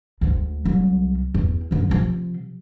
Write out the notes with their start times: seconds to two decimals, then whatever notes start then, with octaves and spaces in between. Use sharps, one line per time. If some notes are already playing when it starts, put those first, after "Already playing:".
0.21 D2 G#3
0.65 C2 F#3
1.34 E2
1.71 F#2 D3
1.89 C3 F3